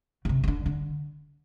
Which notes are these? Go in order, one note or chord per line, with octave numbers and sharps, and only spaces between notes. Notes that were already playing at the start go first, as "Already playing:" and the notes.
C#3
C3
C#3
D3
D3